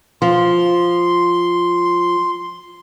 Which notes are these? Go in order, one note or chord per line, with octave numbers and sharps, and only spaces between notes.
F3 C6